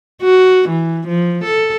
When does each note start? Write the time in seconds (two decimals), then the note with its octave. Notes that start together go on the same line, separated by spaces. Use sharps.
0.22 F#4
0.69 E3
1.08 F3
1.45 A4